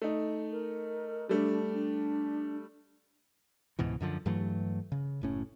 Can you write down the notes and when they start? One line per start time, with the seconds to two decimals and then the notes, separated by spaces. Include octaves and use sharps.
0.02 A3 D#4
0.51 A#4
1.29 G3 A3 D4
1.73 D4
3.79 C#2 G#2 B2 E3
4.00 F#2 D3 F3
4.26 G2 E3 F#3 A3
4.92 C#3
5.21 F#1 A2 C#4